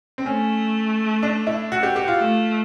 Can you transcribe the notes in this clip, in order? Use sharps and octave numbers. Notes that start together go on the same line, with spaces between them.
C4
A3 C#4
D4
E4
F#4
G4
G4
F4
A3